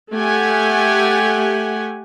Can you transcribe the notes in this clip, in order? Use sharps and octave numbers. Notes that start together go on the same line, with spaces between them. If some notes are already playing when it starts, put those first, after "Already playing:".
A3 G4 F#5 G#5